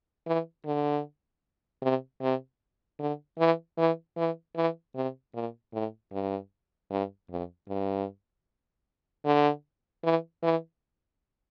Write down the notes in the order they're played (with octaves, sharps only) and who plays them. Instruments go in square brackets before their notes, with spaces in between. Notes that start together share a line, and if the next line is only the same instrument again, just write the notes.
[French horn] E3
D3
C3
C3
D3
E3
E3
E3
E3
C3
A#2
A2
G2
G2
F2
G2
D3
E3
E3